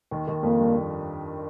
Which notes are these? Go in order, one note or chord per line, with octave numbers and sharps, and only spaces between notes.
D#2 D#3
D#2 D#3
F2 F3 A#3
G2 G3